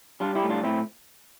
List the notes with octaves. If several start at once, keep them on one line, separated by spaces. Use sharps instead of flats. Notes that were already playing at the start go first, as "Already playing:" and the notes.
G3 D4 F4
E4 G4
A2
D4 F4
A2 C4 E4